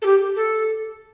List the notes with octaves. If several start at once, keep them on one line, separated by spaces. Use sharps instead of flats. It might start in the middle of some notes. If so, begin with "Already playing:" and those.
A4
G4
A4